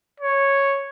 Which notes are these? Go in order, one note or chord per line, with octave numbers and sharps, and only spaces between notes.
C#5